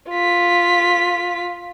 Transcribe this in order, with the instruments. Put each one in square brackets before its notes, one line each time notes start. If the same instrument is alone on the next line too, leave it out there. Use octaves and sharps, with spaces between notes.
[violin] F4 B6